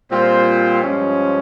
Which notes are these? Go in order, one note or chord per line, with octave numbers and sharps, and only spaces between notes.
A#2 G3 C4 F4 C5
G2 F3 G#3 C#4